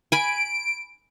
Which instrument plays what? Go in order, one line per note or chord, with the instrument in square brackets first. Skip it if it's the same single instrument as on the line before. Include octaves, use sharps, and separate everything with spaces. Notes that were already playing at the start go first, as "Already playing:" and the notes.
[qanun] G#5 B5 [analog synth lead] D7